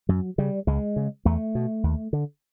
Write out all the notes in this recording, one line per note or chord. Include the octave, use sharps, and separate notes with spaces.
F#2 F#3
C#3 G3
C#2 G#3
C#3
E2 A3
B2
D#2
D3